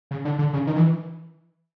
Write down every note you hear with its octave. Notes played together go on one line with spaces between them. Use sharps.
C#3
D3
D3
C#3
D#3
E3